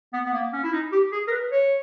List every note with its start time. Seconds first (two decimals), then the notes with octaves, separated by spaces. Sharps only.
0.13 B3
0.26 B3
0.33 A#3
0.53 C#4
0.63 E4
0.73 D#4
0.92 G4
1.12 G#4
1.28 A#4
1.32 B4
1.52 C#5